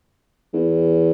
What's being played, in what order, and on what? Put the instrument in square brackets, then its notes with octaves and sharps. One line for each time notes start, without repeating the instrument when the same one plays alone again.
[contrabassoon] E2